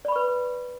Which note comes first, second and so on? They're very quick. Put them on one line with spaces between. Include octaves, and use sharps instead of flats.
D5 B5 C#6 B4